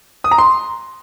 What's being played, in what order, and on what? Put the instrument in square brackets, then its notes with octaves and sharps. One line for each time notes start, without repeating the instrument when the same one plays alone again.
[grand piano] D#6
A#5
C6